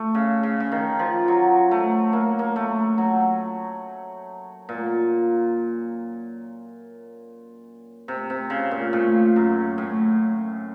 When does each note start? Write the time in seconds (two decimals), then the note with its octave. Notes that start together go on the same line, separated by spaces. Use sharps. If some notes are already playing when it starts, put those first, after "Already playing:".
Already playing: A3
0.15 C#3
0.43 C#3
0.60 C#3
0.72 D#3
0.99 F3
1.28 F#3
1.71 A3
2.13 A#3
2.39 A#3
2.56 A3
2.98 F#3
4.69 A#2
8.08 C3
8.30 C3
8.50 C#3
8.71 A#2
8.93 A2
9.36 F#2
9.78 A2